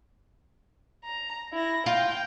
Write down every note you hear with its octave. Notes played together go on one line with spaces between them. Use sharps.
A#5
E4 A#6
F4 G5